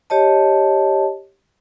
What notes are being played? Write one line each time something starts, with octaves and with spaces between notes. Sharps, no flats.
G4 C#5 D#5 A5